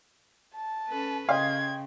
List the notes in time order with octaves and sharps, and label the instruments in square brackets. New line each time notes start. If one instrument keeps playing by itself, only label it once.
[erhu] A5
[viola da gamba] C#4 A4 B4
[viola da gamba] C#3 [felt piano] D#5 G5 C6 [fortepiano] F5 [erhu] G#6